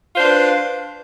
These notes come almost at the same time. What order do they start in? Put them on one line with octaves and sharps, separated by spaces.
F4 C5 D4 B4